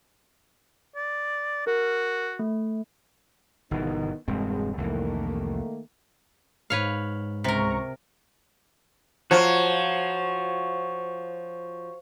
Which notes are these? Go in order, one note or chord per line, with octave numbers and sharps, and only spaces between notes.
D5
F#4 A#4
A3
G1 B2 D#3 E3 B3 D#4
E1 G2 G#3 C4
C2 F2 D#3 E3 A3 A#3
G#2 B4 C#5 F5
C#2 C3 A#4 A#5 C#6
F3 F#4 C#5 A#5